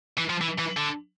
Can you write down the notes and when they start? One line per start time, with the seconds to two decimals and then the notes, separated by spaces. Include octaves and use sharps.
0.18 E3
0.30 F3
0.41 E3
0.59 E3
0.77 D3